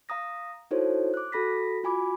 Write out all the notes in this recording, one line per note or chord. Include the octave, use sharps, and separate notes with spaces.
F5 A#5 D#6 A#6
D#4 E4 F#4 A4 C5 C#5
D6 F#6
F#4 A4 B5 A#6 B6
F4 F#4 G#5 B5 D6